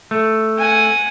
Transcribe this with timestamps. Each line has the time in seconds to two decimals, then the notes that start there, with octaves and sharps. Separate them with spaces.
0.11 A3
0.58 F#5 G#5